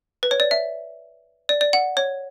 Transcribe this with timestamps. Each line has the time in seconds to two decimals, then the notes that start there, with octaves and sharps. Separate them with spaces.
0.23 B4
0.31 C#5
0.40 D5
0.51 E5
1.49 D5
1.61 D5
1.73 F#5
1.97 C#5